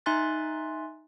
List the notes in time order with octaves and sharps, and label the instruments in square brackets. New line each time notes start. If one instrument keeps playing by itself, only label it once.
[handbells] D#4 E5 G#5 C6 F#6 A6